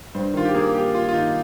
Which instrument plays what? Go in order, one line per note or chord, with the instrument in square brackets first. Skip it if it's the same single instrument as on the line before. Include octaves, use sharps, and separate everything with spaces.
[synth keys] G2 [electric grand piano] C5
[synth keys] D#3 [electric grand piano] F4
[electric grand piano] G4
[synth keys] A#3 [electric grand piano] G#4
[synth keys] G2 [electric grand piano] G4
[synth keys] G2 [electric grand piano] F4
[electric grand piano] F4
[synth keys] D#3 [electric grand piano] D#4